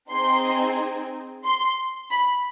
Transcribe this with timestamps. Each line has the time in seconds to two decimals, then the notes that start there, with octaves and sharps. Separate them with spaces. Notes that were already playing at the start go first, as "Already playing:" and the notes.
0.11 C4 D#4 G#4 C6
1.44 C6
2.10 B5